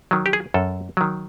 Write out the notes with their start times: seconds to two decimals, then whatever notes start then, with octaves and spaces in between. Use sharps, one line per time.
0.11 D#3 F#3
0.26 G4
0.33 G#4
0.54 F#2 A4
0.97 D#3 F#3